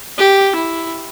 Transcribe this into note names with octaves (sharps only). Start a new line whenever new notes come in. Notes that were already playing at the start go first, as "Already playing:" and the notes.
G4
E4